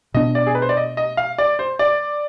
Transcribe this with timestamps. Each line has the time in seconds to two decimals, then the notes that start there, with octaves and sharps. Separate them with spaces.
0.14 B2 B3 D4 D#5
0.35 D5
0.47 G#4
0.55 B4
0.62 C5
0.69 D5
0.77 D#5
0.97 D#5
1.17 F5
1.38 D5
1.59 C5
1.79 D5